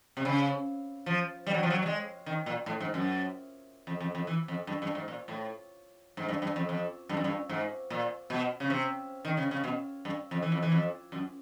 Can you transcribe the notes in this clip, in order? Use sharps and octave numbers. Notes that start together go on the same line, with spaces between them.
C3
C#3
F3
G3
F#3
F3
F#3
G3
G#3
D#3
A#2
A2
G#2
F#2
F2
F2
F2
E3
F2
G2
G2
G#2
A#2
A2
G#2
G2
G2
F2
F2
G2
F#2
G2
G#2
A#2
B2
C#3
C3
D#3
C#3
C#3
B2
G2
F2
E3
F2
E3
F2
F#2